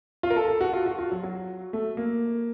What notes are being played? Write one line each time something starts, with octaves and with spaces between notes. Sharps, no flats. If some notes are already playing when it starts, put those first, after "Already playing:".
F4
A#4
A4
A4
F#4
F4
F#4
F4
F#3
F#3
A3
A#3